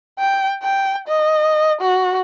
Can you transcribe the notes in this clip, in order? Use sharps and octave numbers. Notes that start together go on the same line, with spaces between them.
G5
G5
D#5
F#4